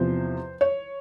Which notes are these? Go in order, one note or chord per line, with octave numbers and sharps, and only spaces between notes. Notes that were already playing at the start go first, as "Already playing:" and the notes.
Already playing: E2 C3 F3 C5
C#5